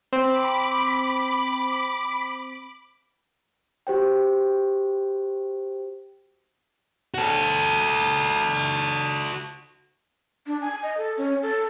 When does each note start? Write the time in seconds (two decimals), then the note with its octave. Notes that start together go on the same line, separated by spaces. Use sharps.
0.13 C4 B5 D6
3.87 F#4 G4 C5 G5
7.14 F#4 A4
10.47 D4
10.61 G#5
10.83 D#5
10.97 A4
11.18 C#4
11.42 A4